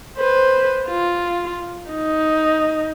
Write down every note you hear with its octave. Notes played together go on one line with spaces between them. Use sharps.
B4 C5
F4
D#4